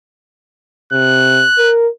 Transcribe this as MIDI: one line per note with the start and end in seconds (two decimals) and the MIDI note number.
0.93 1.44 48
0.93 1.72 90
1.58 1.88 70